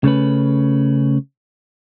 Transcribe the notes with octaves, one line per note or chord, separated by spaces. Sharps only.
C#3 A3 C#4 B4